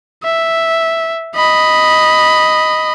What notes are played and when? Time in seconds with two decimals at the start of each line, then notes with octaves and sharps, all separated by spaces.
0.24 E5
1.36 D#5 B5